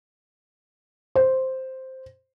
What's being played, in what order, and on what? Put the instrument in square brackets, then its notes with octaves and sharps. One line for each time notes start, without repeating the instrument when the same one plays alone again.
[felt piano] C5